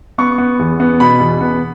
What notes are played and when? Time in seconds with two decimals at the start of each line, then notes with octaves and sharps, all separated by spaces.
0.18 B3 C#6
0.38 B3
0.59 E2
0.80 B3
1.00 B2 B5
1.20 E2
1.41 B3